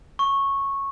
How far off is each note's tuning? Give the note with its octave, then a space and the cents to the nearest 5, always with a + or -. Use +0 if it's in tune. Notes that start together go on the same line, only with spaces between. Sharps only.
C#6 -10